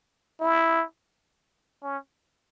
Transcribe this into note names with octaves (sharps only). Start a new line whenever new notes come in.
E4
C#4